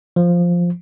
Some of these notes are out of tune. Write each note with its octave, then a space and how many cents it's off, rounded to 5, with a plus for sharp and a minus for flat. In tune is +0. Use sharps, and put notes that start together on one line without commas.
F3 +0